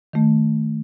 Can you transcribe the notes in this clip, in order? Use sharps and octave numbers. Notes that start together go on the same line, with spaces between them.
D#3 A3